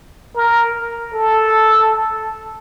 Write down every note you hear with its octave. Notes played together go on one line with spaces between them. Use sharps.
A#4
A4